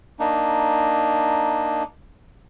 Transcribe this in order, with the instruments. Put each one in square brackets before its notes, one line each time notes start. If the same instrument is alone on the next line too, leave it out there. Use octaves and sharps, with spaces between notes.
[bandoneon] A#3 D4 D#4